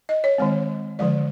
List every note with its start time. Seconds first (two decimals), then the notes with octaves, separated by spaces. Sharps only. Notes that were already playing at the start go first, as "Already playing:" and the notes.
0.09 D#5
0.24 C#5
0.38 D#3 G#3 C4
0.99 D3 F3 G#3 D5